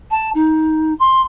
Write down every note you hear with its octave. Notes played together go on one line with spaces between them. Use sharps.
A5
D#4
C6